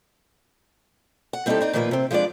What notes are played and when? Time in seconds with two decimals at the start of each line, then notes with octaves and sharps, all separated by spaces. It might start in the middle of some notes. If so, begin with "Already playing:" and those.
1.33 F#5
1.46 G3 C4 D#4 E4 G4 A4
1.61 C4 D#4 D5
1.73 A#2 D#3 F3 A#3 B4
1.91 C3 C4
2.11 F3 G#3 B3 D4 D5